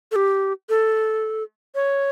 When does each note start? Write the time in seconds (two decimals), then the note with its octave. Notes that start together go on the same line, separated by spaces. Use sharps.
0.12 A4
0.16 G4
0.69 A4
1.75 C#5